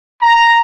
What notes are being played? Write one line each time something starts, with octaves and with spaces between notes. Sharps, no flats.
A#5